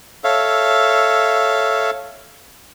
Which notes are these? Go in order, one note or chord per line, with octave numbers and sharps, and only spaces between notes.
A4 C#5 E5 F5